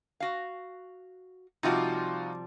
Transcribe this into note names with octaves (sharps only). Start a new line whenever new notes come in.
F#4 F5
C3 F3 G3 D#4 F4 F#4